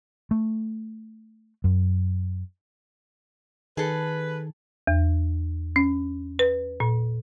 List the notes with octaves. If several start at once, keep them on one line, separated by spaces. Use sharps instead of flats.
A3
F#2
D#3 G#4 A4 B4
E2
C#4
B4
A#2